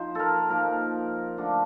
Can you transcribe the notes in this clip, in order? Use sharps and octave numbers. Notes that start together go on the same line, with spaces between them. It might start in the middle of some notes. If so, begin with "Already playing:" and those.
Already playing: F3 D#4 C5
A4 A#4
F3 A#3 D#4 A#4
D3 A3 D4 F4